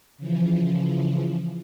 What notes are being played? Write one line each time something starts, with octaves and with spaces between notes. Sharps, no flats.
C#3 E3 F3